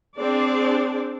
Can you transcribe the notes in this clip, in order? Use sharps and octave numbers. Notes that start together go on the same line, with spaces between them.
C4 D4 G#4 D5